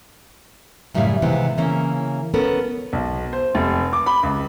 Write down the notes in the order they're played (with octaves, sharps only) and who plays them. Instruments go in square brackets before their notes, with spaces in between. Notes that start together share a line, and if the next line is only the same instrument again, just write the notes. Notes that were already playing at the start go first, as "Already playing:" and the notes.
[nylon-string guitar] F#2 A2 C#3 G3 E5 F5
C3 D#3 E3 G#3 B3 C4
C#3 E3 A#3 C#4
B3 C#4 A4 A#4
[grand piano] B1
C5
F1
D6
B5
C#2